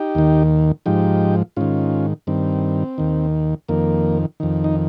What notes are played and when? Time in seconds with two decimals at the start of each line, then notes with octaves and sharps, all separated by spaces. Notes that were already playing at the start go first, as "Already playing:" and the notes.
Already playing: D#4 G4
0.15 D#2 D#3
0.86 G#2 F3 D#4 G4
1.56 G#2 D#3 C#4 F4
2.27 G2 D#3 C4
2.98 D#2 D#3
3.69 F2 D#3 A#3
4.40 F2 D#3
4.64 D#4